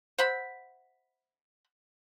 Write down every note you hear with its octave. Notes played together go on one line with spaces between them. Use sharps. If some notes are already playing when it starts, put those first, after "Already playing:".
C5 E5 F#5 B5